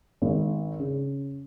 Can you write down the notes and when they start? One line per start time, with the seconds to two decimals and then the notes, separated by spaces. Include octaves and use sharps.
0.22 G#1
0.79 C#3